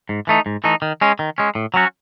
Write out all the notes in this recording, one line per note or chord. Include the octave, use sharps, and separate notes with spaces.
G#2
E3 A3 D#4
G#2
E3 A3 D#4
D#3
G#3 C#4
D#3
G#3 C#4
A2
F#3 C#4 F#4